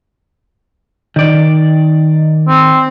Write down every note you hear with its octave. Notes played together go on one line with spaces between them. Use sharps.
D#3 D5
C4